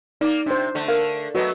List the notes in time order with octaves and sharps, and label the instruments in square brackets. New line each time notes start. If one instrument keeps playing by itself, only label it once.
[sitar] A#3 [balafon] D#4 [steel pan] D5
[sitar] C3 [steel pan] D4 C5
[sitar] D3 A3
[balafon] A#4 [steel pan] F5
[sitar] F#3 A3 B3 [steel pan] F#4 B4 D#5